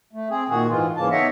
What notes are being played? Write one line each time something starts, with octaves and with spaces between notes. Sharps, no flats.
A3
C4 G#4
A#2 D#3 F#4 G#4
G#2 E3 G#3 F4
G#2 C#3 E3 A#3 A5
B3 D#4 C#5 D#5 E5 F#5